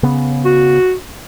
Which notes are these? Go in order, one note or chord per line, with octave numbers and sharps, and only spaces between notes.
C#3 B3
F#4